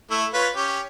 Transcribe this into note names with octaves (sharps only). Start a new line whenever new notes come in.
A3 E4
F4 B4 C#5
C#4 G4